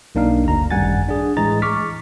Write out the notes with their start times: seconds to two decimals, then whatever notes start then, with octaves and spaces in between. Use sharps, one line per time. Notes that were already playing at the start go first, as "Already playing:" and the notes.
0.15 B1 A#3 D4 D#4 F5
0.45 G1 D2 A#5
0.71 G#1 F#2 G3 F#5 G#5 A6
1.08 D4 G#4
1.37 A2 E3 G#3 G#4 A#5 A6
1.62 C#6 D6 F6 B6